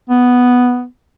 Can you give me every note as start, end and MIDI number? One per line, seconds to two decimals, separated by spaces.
0.09 0.85 59